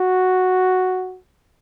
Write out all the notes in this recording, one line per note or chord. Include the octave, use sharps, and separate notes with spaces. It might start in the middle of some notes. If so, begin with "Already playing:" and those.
Already playing: F#4